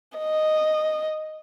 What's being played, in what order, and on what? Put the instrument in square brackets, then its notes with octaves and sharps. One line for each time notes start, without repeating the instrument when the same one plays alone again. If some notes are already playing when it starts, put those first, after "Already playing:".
[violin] D#5